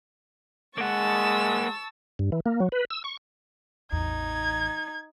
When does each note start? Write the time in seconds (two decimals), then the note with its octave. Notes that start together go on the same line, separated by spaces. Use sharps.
0.78 G#3 A#3 F#5 A5 C#6 E6
2.19 G2
2.32 E3
2.46 A#3
2.60 F#3
2.72 B4
2.91 E6
3.04 C#6
3.92 A1 E2 D#4 G#6